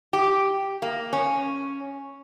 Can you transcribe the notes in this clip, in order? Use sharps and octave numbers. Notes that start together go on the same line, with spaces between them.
G4
A#3
C#4